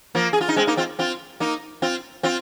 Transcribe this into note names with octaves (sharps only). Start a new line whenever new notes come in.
F3 A#3
G#4
F4
D#4
G#3 C4
A#3 D#4
C4 F4
C4 F4
A#3 D#4
C4 F4
C4 F4